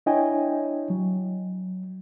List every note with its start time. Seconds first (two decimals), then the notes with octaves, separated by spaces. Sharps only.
0.06 D4 E4 C#5 D#5 G5 G#5
0.90 F#3